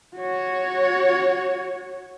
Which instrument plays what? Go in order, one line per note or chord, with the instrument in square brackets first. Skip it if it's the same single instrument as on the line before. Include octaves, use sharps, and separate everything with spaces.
[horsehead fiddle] F#4 C#5